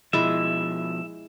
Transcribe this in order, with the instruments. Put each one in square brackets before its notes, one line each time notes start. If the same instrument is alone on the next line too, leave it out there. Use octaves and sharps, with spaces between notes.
[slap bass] B2 F3 [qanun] G#3 E4 D6 [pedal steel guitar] E5